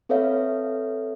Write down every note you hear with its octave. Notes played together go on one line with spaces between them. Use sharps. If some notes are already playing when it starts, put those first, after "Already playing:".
C4 A4 B4 C#5 E5 F5